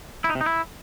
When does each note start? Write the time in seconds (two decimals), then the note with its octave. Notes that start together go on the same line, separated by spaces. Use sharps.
0.24 E4
0.30 D#4
0.35 C3
0.41 D#4
0.46 E4